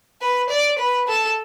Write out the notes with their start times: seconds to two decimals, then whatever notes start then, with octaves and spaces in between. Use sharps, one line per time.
0.21 B4
0.50 D5
0.79 B4
1.08 A4